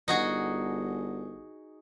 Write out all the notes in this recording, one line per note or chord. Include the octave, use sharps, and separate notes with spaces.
G1 D#4 F#4 G#4